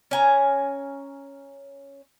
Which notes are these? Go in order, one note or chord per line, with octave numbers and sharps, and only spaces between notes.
C#4 G#5 A#5